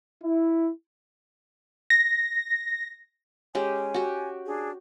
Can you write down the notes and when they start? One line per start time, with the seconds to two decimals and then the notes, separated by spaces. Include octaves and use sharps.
0.23 E4
1.90 A#6
3.55 G#3 C#4 G4 G#5
3.94 F#4 G4
4.45 D4 G#4